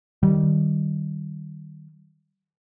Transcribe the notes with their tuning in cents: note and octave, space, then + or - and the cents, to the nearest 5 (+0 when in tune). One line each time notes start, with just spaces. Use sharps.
D#3 -15 G3 -20